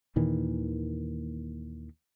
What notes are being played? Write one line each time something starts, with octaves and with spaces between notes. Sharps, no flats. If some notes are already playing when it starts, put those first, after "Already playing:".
D#2 A#2 D#3 E3